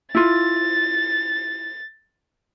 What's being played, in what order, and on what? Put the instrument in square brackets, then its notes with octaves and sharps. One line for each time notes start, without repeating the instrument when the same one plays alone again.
[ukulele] E4 F4 [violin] A6